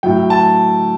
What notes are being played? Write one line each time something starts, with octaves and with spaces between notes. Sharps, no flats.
A2 F#3 G5
A5